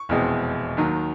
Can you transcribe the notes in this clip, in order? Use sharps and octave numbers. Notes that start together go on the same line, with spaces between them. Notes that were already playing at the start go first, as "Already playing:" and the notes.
Already playing: C#6
F1 E2 B2 G#3 C4
D#2 D#3 F#3